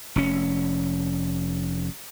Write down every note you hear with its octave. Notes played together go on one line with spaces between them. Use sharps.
F1 C#4